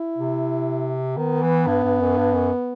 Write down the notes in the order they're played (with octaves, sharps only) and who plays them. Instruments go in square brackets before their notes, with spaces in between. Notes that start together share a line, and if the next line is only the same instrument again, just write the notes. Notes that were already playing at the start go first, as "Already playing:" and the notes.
Already playing: [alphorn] E4
[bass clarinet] C3
[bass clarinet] D#3 [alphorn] B3
[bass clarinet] E3
G2
G2
F#2
G2
F#2